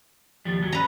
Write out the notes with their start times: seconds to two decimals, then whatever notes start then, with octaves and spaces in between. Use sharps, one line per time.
0.45 D#2 F3 G3
0.59 D#2 F#3
0.72 C#4 B4 A#5